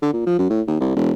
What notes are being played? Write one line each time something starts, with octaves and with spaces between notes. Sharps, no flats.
D3
A#2
F3
F#2
A2
D#2
C2
E1